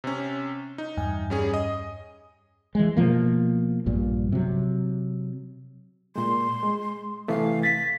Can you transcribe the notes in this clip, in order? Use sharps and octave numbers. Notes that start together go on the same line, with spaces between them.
C3 C#4
D#4
E2 G2 G#5
G3 C#4 G#4
D#5 D#6
E3 G#3
B2 F3 A#3
A#1 G2 A#2
C3 F#3
A#2 G#3 C6
G#3
C3 E3 A3 F5
A6 B6